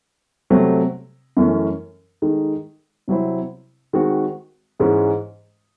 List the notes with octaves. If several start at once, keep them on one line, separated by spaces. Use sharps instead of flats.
C3 F#3 A3 C4
F#2 E3 A3 C#4
D#3 G#3 D#4 A4
C3 F#3 C4 E4 C5
D#3 G#3 C4 F#4
G#2 E3 G#3 C#4